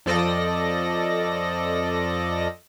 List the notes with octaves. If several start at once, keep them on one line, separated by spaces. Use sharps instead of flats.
F2 F3 A4 D5 D#5 A#6